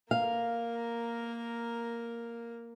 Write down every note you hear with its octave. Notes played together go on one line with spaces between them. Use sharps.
A#3 A#4 F5